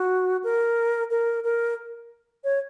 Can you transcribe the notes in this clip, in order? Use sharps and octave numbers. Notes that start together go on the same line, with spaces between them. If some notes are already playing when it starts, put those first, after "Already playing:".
Already playing: F#4
A#4
A#4
A#4
C#5